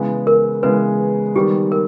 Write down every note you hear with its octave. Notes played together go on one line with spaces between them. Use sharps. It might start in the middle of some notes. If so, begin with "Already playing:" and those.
Already playing: C#3 E3 G#3 B3
A#4
C#3 E3 G#3 B3 B4
D#3 G3 B3 G4
A#4